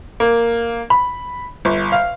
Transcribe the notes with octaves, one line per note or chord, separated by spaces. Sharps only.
A#3
B5
G1
F5